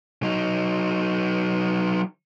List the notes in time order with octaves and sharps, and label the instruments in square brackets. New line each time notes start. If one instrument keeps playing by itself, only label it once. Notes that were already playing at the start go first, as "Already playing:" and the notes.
[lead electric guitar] F#3 D#4